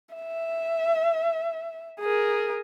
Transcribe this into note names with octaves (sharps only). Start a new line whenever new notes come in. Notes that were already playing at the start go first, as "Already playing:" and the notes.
E5
G#4 A#4